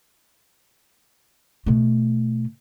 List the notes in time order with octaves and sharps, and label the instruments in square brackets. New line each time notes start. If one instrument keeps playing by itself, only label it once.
[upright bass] B2 A3